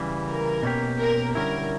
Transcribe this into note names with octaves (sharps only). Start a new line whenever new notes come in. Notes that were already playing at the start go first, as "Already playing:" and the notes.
Already playing: C#3 E3 G3
A#4
B2 A#3 C#4 G4
A#4
D3 G3 C#4 E4 A#4